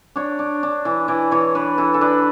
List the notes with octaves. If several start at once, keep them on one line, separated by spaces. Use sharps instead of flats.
D4 C#5
D4
D4
E3
E3 D5
E3 C#5
D4 B4
E3 A4
A4
D4 B4